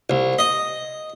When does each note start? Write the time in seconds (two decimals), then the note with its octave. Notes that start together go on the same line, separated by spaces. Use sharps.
0.10 C2
0.39 D#5